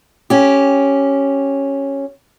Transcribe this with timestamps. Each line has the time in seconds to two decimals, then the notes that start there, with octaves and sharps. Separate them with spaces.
0.30 C#4 G4